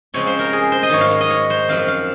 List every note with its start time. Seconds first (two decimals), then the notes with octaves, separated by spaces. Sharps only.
0.14 C#3 F3 G#3 C4 C#5
0.27 C5
0.39 A#4
0.53 G#4
0.72 C5
0.83 D#5
0.89 G#2 D#3 F#3 C#5
1.01 F5
1.11 F5
1.21 D#5
1.30 C#5
1.50 C5
1.69 F#2 F3 C4 F5
1.88 F5